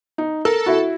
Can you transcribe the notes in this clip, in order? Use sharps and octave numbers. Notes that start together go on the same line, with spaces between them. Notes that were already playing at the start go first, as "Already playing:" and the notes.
D#4
A4 A#4
E4 F#4